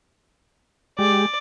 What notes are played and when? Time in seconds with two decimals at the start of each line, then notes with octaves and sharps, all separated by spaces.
0.99 G#3 G4 D5